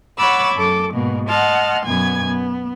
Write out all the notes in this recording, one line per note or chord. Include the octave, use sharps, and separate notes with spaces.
C#5 F#5 B5 D6 E6 A6
F#2 A4 D6
G#2 B2 A#3
D#5 F#5 A5 C6 F6
F#2 B2 B3 G#5 G#6
B3